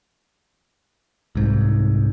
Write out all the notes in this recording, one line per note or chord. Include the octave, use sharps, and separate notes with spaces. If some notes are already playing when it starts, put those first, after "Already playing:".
C2 G#2